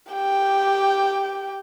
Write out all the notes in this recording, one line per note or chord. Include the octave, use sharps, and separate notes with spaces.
G4 G5